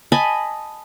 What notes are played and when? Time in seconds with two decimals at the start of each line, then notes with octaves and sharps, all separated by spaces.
0.12 D#5 G#5 A5 B5